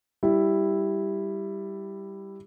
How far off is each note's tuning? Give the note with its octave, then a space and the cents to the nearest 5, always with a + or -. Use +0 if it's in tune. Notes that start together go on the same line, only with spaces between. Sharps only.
G3 +0 E4 +0